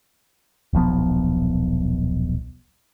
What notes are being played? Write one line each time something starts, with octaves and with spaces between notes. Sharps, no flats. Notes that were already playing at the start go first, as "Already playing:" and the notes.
D#1 B1 F3 B3